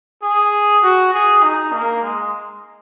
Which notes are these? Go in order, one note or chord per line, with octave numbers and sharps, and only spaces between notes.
G#4
F#4
G#4
D#4
A#3
G#3